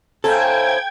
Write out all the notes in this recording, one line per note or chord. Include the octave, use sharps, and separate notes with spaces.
A2 C4 A4 F5 G5 G#5 A#5 G#6